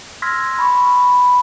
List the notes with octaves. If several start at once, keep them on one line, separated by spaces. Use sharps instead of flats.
C6 E6 F6 G#6 A#6 B6
B5 C#6
B5